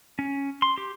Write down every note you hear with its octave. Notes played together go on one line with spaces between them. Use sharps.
C#4
C6
G4